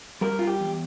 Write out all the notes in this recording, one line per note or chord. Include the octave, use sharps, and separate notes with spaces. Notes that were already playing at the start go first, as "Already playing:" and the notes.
G3 A#4
F4
G4
E2